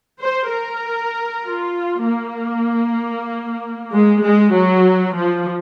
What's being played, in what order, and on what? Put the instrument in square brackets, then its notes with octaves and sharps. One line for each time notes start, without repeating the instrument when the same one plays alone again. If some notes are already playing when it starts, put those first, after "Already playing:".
[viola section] C5
A#4
F4
A#3
G#3
G#3
F#3
F3